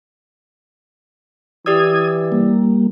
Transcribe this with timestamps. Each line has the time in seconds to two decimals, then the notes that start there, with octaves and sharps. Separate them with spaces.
1.66 E3 G4 D5 D#6 E6 G#6
2.32 G3 A#3